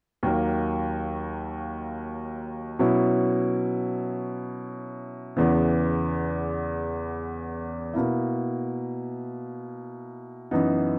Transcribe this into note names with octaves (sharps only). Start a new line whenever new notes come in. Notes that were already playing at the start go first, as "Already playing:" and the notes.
D#2 D#3 F#3 A#3
B2 F#3 C#4 E4
E2 C#3 E3 B3
B2 A#3 E4
F#2 E3 B3 D#4